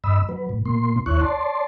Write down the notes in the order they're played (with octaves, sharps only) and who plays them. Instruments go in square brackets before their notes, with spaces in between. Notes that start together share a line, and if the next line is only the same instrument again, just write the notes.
[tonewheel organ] G2 D#5 B5 E6
F#3 B4
A2
A#2 A#3 C6
D#2 E4 C#5 C#6 F#6
C#5 D5 A5 C6